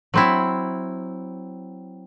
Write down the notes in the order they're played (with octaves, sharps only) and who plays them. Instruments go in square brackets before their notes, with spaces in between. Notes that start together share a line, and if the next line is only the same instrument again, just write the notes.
[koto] F#3 C4 E4